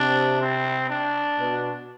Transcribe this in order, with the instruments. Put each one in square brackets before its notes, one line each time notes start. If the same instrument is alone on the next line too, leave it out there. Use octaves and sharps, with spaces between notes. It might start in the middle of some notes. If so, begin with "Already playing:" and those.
Already playing: [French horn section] C3 [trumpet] D4
[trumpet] C4
D4
[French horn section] B2